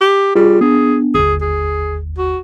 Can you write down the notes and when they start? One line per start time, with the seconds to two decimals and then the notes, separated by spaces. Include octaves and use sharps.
0.01 G4
0.36 G3 F4 G#4
0.61 B3 D4 G#4
1.15 G1 D#2 G#4
1.42 G#4
2.18 F#4